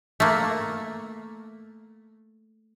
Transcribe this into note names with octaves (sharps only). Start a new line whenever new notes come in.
A3 A#3